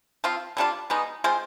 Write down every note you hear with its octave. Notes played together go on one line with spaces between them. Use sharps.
F3 C4 F4
D3 G3 D4 F4
B2 G#3 B3 D#4
G#3 C4 F4 C5